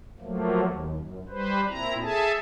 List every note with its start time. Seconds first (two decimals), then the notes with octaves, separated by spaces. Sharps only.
0.20 F3 F#3 A3 A#3
0.62 D#2
0.93 F#2
1.29 G3 B4 C5
1.68 A#2 C4 E4 A#5
2.02 G#4 A4 E5 G#5 A5